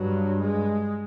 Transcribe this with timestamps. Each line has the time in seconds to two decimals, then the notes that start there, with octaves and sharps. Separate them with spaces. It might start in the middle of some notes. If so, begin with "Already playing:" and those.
Already playing: G2 F#3
0.41 G#3